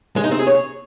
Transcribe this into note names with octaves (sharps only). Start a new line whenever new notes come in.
G#3
D#4
C4
G#4
C#5